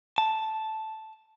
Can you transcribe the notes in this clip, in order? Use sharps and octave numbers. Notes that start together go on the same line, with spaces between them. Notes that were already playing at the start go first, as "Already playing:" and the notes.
A5